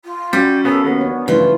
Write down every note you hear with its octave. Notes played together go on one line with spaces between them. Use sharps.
F4
F#3 G3 C#4 F#4
C#3 B3 A4 A#4
D#2 B3
D4 C#5
G2 C#3 E3 F3 A3 F4